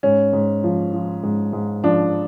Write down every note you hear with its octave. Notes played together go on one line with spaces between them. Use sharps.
G#2 C#4
G#2
F3
F3
G#2
G#2
F3 D4